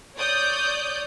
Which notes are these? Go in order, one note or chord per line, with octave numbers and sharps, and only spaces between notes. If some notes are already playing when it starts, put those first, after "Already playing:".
C#5 D5 D#6 G6